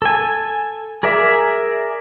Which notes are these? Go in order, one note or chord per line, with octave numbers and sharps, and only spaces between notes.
A4 G#5
G#4 A#4 D5 E5